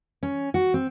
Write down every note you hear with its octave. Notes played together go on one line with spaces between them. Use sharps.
C#4
F#4
C4